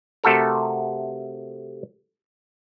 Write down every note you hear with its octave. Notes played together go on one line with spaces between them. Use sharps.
C3 A3 F#4 A4 A#4